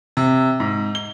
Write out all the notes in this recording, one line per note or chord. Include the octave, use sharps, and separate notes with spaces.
C3
G#2
G7